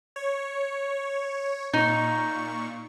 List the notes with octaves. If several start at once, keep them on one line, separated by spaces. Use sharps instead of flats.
C#5
A#2 D#4 C#6